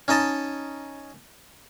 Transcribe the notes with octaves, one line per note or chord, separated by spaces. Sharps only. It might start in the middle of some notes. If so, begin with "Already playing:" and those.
C#4 D#4 D#5 A5